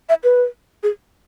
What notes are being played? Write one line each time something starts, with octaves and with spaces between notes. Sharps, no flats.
E5
B4
G#4